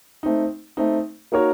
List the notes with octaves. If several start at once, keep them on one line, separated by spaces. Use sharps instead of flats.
A3 C4 D#4
A3 C4 D#4
A#3 D#4 F#4 A#4 C#5